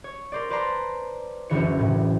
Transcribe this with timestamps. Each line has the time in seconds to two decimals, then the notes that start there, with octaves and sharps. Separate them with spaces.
0.04 C#5
0.32 A#4 C5 D5
0.50 B4 C5 D5 A5 A#5 C6
1.49 F#1 C#2 D3 E3 C#5 C#7
1.79 A2 C#3